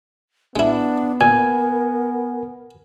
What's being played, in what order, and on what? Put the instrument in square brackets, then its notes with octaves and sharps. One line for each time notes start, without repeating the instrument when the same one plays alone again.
[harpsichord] G#3 E4 [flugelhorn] B3 [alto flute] D4
[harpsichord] A#2 [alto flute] A#4 [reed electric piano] G#5